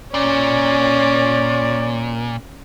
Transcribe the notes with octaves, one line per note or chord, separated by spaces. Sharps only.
A#2 C#4 D5